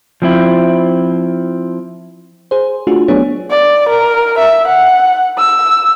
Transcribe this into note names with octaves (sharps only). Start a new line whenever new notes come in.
F3 C4 E4
G#4 C5
A3 D4 F4 F#4 G#4
F#3 A3 B3 D4 G#4 C#5
D5
A#4
E5
F#5
E6